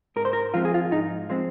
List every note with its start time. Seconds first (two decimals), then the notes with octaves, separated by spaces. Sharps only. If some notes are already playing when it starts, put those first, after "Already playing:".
0.16 G#2 A#4
0.25 C5
0.33 A#4
0.54 F3 G#3 C4 F4
0.65 G#4
0.74 F4
0.91 G#2 D#4
1.29 F3 G#3 C4